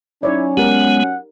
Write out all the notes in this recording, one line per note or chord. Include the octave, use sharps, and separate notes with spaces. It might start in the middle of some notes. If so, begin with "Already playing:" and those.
F#3 C#4 D#4 E4 C#5 D5
G#3 B3 G4 A#4 F#5